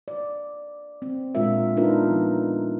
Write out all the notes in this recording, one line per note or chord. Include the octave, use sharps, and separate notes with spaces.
D5
C4
A#2 G#3 D4 F4 A#4 E5
B3 D4 D#4 F4 A#4 B4
F3